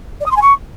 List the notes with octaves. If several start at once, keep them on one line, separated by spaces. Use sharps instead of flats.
D5
D#6
C6
G#5
C#6